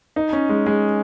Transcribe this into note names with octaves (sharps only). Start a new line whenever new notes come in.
D#4
C#4
G#3
G#3